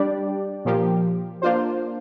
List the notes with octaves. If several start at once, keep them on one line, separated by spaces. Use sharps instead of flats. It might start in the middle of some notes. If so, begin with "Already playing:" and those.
Already playing: G3 D4 G4 D5
A#2 F3 A#3 G4
A#3 D4 F4 C5